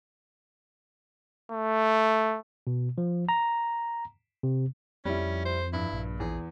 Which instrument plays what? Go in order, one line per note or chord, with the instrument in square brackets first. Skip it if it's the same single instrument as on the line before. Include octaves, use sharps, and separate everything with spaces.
[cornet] A3
[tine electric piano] B2
F3
A#5
C3
[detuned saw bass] F2 [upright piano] G3 E4 [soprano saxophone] C#4
[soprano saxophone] C5
[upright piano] G2 [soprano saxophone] E4
[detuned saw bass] A#1
[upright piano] E2 [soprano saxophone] G#4